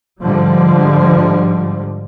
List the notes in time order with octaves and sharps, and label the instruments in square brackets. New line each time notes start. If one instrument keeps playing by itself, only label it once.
[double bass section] G#2 D3 F3 G3